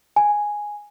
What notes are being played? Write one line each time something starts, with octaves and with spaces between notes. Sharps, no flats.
G#5